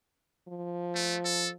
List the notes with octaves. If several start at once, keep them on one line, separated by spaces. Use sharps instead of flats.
F3
A3
A4